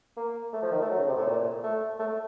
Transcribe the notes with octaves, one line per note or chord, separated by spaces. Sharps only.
A#3
A3
F3
D#3
A3
F#3
C#3
C3
A2
A#2
A3
A3